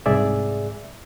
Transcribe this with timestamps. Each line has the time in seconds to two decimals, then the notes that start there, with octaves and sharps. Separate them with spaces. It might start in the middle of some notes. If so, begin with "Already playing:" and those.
0.06 C2 G#2 G#4 D5 E5